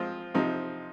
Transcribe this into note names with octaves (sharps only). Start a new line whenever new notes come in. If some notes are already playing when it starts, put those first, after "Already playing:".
Already playing: F3 G#3 C4 F4
C3 F3 C4 D#4